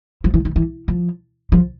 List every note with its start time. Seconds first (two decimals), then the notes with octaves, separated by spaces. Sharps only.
0.24 F3
0.34 E3
0.45 D#3
0.56 E3
0.88 F3
1.52 F3